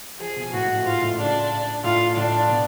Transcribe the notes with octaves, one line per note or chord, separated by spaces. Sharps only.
F3 G#4
B2
A2 F#4
G#2
A2
G#2 F4
A2
C#3 D4
A2 F4
A2 D4
B2